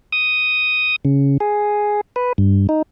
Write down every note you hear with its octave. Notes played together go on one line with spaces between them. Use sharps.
D#6
C#3
G#4
B4
G2
D#4